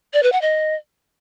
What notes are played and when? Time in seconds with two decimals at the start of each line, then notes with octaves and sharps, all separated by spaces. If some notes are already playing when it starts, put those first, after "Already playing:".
0.14 D5
0.23 B4
0.32 F#5
0.42 D#5